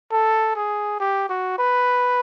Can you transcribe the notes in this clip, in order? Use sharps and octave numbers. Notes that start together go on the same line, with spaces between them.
A4
G#4
G4
F#4
B4